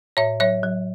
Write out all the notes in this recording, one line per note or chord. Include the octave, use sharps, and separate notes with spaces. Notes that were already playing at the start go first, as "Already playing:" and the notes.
A2 C#5 E5
F#3 C#5 E5
F#3